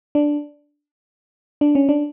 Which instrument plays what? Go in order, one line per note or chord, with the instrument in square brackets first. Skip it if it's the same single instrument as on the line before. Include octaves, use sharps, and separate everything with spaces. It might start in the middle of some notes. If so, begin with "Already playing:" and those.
[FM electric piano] D4
D4
C#4
D4